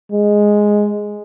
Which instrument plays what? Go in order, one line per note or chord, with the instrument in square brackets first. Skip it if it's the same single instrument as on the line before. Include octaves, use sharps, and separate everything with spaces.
[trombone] G#3